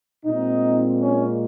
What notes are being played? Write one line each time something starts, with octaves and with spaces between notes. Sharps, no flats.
A#2 G#3 C4 D#4
C#4